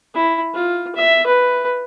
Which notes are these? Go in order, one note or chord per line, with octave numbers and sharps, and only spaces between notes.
E4
F4
E5
B4